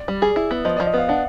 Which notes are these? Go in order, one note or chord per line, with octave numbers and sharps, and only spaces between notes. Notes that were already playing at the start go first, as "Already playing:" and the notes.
Already playing: D5
G3
G#4
E4
B3
F3 D#5
F3 D5
D#5
B3 F5
D4 F#5